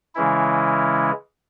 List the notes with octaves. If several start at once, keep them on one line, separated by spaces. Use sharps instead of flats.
C#3 E3 G#3 C#4 E4